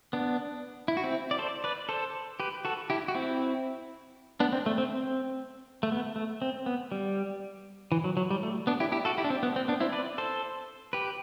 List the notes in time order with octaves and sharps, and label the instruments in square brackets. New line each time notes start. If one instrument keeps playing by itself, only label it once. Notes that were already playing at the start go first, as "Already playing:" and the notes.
[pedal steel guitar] B3 D4
E4
F#4
C4 E4
D5
A4 C5
B4 D5
A4 C5
G4 B4
F#4 A4
E4 G4
F#4
C4 E4
B3 D4
C4
A3
C4
C4
A3
B3
A3
C4
B3
G3
E3
F#3
F#3
G3
A3
B3 D4
E4 G4
E4 G4
F#4 A4
E4 G4
D4
C4
B3
C4
B3 D4
C4 E4
B4 D5
A4 C5
G4 B4